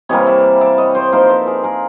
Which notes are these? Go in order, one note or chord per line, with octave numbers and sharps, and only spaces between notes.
C3 E3 G3 A#3 C#5 D#5
D5 E5
D5 E5
C#5 D#5
C5 D5
F3 A#3 D#4 A#4 C5
A4 B4
G#4 A#4
G#4 A#4